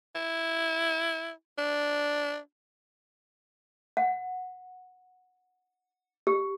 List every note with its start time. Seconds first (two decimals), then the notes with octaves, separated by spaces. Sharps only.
0.15 E4
1.58 D4
3.97 F#5
6.27 G4